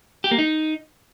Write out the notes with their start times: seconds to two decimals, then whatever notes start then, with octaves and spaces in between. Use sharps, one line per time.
0.24 G4
0.31 A#3
0.38 D#4